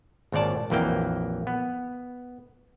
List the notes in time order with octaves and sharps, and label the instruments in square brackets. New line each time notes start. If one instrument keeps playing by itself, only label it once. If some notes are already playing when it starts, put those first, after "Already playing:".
[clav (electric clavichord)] G#1 A#2 C#5 D5 A5
A#1 F2 E3 F#3 A#3 G5
B3